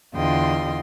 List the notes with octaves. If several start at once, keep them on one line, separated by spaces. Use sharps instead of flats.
E2 D3 F4 D#5 G5 C6